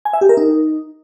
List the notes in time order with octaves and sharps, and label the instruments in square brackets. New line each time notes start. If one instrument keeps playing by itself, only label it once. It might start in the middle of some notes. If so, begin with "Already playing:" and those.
[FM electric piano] G#5
E5
G4
A#4
D#4